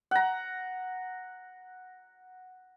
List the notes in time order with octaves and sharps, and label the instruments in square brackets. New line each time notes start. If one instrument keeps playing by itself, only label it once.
[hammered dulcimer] F#5 A#5